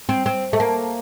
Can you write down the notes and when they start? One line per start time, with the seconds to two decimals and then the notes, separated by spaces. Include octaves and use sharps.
0.09 C4
0.26 C4
0.53 A3
0.60 A#3